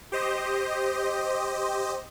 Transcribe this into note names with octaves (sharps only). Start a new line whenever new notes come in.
G4 C5 D#5